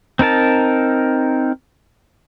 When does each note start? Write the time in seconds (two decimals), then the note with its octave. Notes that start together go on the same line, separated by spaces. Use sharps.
0.19 C4 D#4 A#4 A5